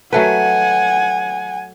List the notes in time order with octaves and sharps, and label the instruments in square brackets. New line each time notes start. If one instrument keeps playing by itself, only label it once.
[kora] F#3 A3 B4 [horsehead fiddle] F#5 G#5